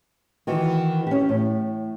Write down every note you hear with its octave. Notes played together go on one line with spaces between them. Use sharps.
D#3 E3 F#4
C#4 G4
A2